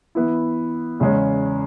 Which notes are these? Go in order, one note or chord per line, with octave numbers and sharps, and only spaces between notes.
E3 B3 E4
E2 C#3 G#3 C#4